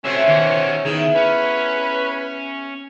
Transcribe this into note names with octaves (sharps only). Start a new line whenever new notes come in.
A3 C4 C#4 F#4 C5 E5
B2 D#3 F#4
D#3 B3 E4 G#4
C#4 B4